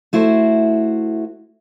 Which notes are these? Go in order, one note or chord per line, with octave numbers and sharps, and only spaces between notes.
A3 E4 F#4 C5